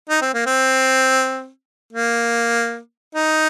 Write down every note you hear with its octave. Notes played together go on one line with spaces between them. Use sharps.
D#4
C4
A#3
C4
A#3
D#4